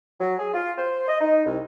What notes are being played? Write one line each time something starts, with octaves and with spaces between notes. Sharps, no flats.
F#3
G#4
F4
C5
D#5
D#4
C2